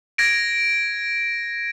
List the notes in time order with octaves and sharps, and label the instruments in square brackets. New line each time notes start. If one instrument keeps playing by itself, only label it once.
[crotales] G#6 A#6 D7